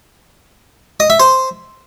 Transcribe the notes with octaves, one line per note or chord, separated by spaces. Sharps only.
D#5
E5
C5